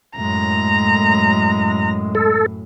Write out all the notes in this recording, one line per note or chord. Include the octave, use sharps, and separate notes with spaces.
F#2 A2 G#3 A#5
A4